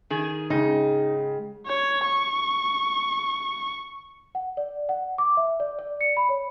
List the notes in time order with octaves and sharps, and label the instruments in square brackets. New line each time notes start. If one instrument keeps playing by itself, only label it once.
[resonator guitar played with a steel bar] D#3 G#4
[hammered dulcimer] G#2 G5 [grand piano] C#3 [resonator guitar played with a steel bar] D#4
[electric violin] C#5
C#6
[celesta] F#5
D5
F#5
D6
E5
D5
D5
C#7
B5
C#5